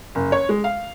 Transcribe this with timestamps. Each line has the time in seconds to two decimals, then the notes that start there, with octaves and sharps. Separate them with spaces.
0.15 F#1
0.32 C#5
0.49 G#3
0.64 F5